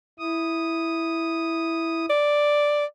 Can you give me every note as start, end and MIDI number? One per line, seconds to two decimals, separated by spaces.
0.19 2.06 64
0.19 2.06 87
2.10 2.85 74